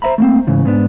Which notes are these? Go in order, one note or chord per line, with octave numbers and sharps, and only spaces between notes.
C5 D#5 E5 A#5 B5
A3 A#3 C4
G#2 C#3 E3
G#2 B3 D4